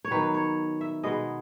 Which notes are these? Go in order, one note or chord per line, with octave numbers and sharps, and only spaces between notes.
C#5
D#3 F#3 B3 B4
C#5
E5
B2 G#3 B3 D#5